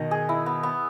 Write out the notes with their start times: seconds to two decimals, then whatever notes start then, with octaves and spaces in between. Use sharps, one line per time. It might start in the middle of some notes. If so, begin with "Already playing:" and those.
Already playing: B2 D#3 D#5
0.11 G#4
0.29 E4
0.46 B3
0.63 B3